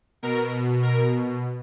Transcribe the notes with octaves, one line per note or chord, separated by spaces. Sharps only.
B2 A#4
A#4